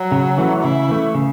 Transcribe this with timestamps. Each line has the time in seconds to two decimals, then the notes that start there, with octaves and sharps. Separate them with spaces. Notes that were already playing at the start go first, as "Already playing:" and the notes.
Already playing: F#3
0.12 C#3
0.38 E3 A3
0.63 C#3 E4
0.89 E3 A3
1.15 C#3